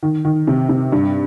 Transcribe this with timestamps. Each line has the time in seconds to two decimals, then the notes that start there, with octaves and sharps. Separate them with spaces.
0.03 D#3
0.25 D#3
0.47 C3
0.69 C3
0.92 G2